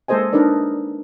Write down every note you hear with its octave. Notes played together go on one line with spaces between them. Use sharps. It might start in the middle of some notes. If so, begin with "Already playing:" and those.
G#3 A#3 A4 C5 D#5 G#5
D4 D#4 A#4 B4 D5